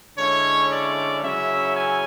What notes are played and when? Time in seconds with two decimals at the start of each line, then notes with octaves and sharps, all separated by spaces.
0.18 D3 G#3 C#4 E4 C#5
0.70 D5
1.23 C#3 F#3 C#4 E4 E5
1.76 G#5